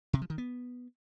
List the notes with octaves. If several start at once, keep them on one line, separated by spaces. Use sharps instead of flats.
C3
F3
D#3
B3